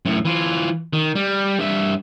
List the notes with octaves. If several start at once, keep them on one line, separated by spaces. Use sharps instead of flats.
F#2 A2
E3 F4
D#3
G3
G2 E5